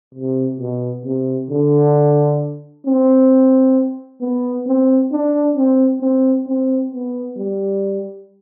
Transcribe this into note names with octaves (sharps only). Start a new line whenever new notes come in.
C3
B2
C3
D3
C4
B3
C4
D4
C4
C4
C4
B3
G3